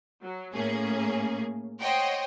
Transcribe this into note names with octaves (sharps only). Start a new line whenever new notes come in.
F#3
A2 A#3 C#4 G#4
C5 C#5 D#5 F#5 G5